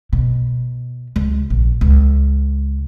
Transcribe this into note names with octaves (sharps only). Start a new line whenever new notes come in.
B2
C#2
A#1
C#2